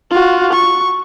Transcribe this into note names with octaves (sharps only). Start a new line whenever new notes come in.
F4 F#4
C#6